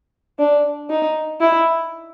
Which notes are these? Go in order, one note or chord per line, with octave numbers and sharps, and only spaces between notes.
D4
D#4
E4